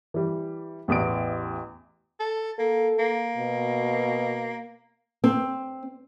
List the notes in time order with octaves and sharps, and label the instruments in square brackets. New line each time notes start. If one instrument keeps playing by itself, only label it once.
[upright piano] E3 G3
A1 E2 D#6 D7
[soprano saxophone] A4
[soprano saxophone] A#3 [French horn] A4
[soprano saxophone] A#3
[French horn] B2
[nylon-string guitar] C4